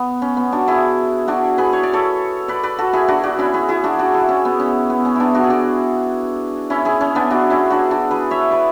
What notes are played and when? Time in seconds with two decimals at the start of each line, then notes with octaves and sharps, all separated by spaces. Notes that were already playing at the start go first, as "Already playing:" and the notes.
Already playing: B3
0.22 C#4
0.37 B3
0.52 D4 F#4
0.68 E4 G#4
1.28 D4 F#4
1.58 G#4 B4
1.73 C#5
1.83 D5
1.93 A4 C#5
2.48 B4 D5
2.63 B4 D5
2.78 F#4 A4
2.93 E4 G#4
3.08 D4 F#4
3.23 D4 F#4
3.39 C#4 E4
3.54 E4 G#4
3.68 E4 G#4
3.84 D4 F#4
3.99 D4 F#4
4.14 E4 G#4
4.29 C#4
4.45 B3
4.60 C#4
4.90 B3
5.05 C#4
5.15 B3 D4 E4
5.35 D4 F#4
5.44 G#4
5.50 D4 F#4
6.70 C#4 E4
6.85 E4 G#4
7.01 C#4
7.15 B3 D4
7.31 D4 F#4
7.50 C#4 E4
7.70 D4 F#4
7.91 D4 F#4
8.11 G#4 B4
8.31 C#5 E5
8.51 B4 D5